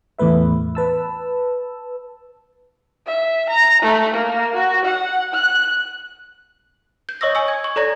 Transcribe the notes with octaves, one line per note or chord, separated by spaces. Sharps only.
E2 A2 A3 B4 E5
B4 A5 E6
E5
A#5
A3
A#3
F#4
F#5
F#6
G6
C#5 D#5 C#6 D#6 E6 A#6
G#5 C#6 E6
G#6
C#6
A4 C#5 D5 A#5 G#6 A#6